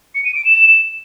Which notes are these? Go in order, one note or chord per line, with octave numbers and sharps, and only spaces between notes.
C#7
D#7
D7
E7